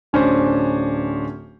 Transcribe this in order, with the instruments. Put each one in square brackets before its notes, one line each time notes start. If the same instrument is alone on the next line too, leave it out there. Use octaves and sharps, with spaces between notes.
[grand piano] D1 C#4 D4 C5